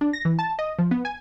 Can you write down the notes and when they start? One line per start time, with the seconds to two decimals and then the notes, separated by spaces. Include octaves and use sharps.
0.01 D4
0.13 A#6
0.25 E3
0.39 A5
0.59 D#5
0.79 F3
0.91 B3
1.05 G#5